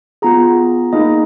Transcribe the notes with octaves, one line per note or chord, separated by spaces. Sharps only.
B3 F4 G#4 A#5
A#3 D#4 G#4 D#5